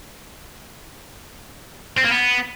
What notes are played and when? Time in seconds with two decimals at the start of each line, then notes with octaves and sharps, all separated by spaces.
1.97 C4
2.03 A#3
2.10 B3